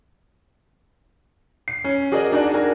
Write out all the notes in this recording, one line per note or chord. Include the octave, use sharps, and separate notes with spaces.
C7
C#4
F#4 G#4 A#4 D5 D#5
D4 D#4 F#4 D5 A5
F#4 A#4 G#5